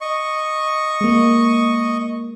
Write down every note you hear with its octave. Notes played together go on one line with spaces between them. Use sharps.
D#5 C#6
G#3 A#3